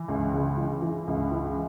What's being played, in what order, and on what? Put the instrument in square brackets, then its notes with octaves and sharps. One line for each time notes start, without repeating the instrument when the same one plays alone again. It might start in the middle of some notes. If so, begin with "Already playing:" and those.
Already playing: [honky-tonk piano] E3
C#2
C#3
E3
E3
C#2
E3